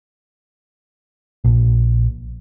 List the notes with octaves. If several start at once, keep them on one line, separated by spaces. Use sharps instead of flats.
A#1